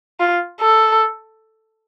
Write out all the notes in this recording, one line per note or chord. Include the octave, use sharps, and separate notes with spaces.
F4
A4